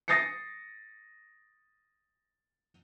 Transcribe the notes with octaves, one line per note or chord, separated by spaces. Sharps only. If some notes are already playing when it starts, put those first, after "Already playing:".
D#6 A6 A#6 C7 C#7